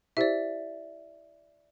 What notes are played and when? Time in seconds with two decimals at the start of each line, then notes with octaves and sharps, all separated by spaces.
0.17 E4 G4 C5 D5 E5